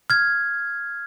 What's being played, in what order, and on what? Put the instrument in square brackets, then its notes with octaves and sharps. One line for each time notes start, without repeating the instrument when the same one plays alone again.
[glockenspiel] F6 G#6